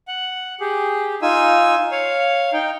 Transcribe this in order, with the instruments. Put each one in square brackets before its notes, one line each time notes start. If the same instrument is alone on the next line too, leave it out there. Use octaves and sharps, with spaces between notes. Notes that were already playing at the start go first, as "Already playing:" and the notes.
[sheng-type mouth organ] F#5
G4 G#4
D#4 F4 G#5 E6
C#5 F5
D#4 G5